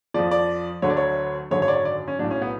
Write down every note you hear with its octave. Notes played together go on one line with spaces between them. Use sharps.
F2 F3 D5
D5
D2 D3 F#3 C#5
D5
C#5
G#1 F#2 D3 F#3 C#5
C#5
D5
C#5
D5
C#4
B1 A2 F#3 D4
C#4
B3